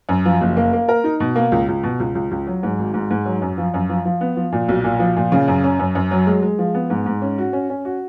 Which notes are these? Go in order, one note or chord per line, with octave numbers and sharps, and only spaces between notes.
F#2
F3
F#1
A#3
A#3
A#4
D#4
B2
A#3
C#2
C#2
B2
C#2
C#2
C#2
F#3
G#2
G#1
G#2
G#2
F#3
F#2
F3
F#2
F3
F3
B3
F3
A#2
B1
A#2
F3
A#2
C#3
F#2
C#4
F#2
F#2
F#3
G#3
G#3
F3
B3
G#2
G#2
C#4
F#4
C#4
C#4
F#4